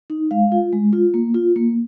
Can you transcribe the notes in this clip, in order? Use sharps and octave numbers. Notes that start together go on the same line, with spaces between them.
D#4
G#3 F5
F4
G#3
F4
A#3
F4
A#3